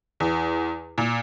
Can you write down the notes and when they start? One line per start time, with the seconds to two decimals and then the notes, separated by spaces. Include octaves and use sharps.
0.20 E2
0.98 A#2